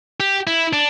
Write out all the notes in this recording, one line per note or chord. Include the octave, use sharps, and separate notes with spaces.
G4
E4
D4